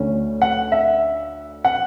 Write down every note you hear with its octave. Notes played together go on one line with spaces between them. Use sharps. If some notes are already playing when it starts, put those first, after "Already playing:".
Already playing: D2 D3 A3 C#4
F#5
E5
F#5